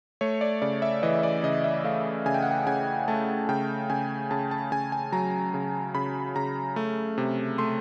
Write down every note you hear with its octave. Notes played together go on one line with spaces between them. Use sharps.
A3 C#5
D5
C#3 D5
E5
E3 D#5
D5
C#3 D#5
E5
A3 F5
C#3 G#5
G5
F#5
G5
C#3 G#5
A3 A5
C#3 G5
C#3 G#5
C#3 A5
A5
C#3 G#5
G#5
F#3 A#5
C#3
C#3 B5
C#3 A#5
A3
C3
A3 C6